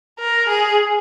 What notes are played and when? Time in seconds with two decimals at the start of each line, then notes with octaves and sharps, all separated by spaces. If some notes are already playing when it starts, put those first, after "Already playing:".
0.19 A#4
0.49 G#4